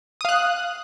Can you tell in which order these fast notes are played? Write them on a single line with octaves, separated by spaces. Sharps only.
D#6 F5 F#6